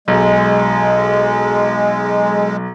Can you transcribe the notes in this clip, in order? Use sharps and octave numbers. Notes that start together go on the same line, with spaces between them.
B1 G#3